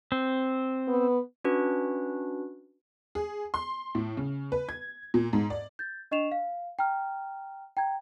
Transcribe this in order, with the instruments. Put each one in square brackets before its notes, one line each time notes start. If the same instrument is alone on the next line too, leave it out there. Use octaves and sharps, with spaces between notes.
[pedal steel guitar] C4
[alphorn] B3
[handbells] C#4 D4 F#4 B4
[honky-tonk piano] G#4
C6
A2
C#3
B4
G#6
A#2
G#2
D5
[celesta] G6 A6
D4 D#5 C#6 C7 E7 F7
F5
G5 A#5 F6
G5 A#5 G#6